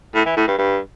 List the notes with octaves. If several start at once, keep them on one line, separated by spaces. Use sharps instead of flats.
A2
E3
A2
G2
G2